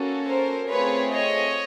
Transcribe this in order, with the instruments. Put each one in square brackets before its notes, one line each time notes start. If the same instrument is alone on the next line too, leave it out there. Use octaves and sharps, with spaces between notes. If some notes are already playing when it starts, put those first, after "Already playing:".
Already playing: [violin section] A#3 C#4 F#4 A4
A#4 C5
A3 C4 F4 G#4 B4 C#5
C#5 D#5